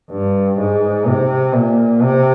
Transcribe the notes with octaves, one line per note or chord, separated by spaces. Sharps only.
G2
G#2
C3
A#2
C3